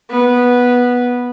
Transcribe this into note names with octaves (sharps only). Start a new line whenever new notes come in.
B3